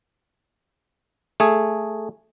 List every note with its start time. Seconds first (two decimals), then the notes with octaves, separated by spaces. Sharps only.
1.40 A3 G#4